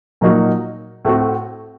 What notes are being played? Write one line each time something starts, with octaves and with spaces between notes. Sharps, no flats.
A#2 F#3 A#3 D#4 F#4
A2 A3 C4 F#4